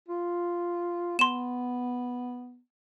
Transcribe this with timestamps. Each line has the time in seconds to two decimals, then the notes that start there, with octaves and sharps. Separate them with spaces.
0.08 F4
1.19 B3 C6 E7